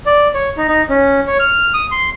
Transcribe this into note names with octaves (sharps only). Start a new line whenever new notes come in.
D5
C#5
D#4
D#4
C#4
C#5
F6
D#6
C6